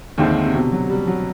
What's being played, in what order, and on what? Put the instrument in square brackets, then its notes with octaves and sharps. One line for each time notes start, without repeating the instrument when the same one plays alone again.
[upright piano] D#2 D#3 G#3 C4 E4 [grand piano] D3
[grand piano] D3
C3
B2
C3
F#3
G3
F#3